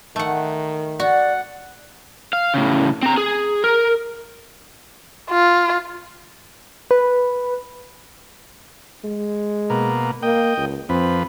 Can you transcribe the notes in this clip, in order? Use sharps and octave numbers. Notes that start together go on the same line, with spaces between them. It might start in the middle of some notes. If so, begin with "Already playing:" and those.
D#3 A3 F#5
F#4 D5 F#5
F5
A2 C#3
C4 A#5
G#4
A#4
F4
B4
G#3
B2 A#3
A#3 D#5 G5
C#2
F2 C4 B4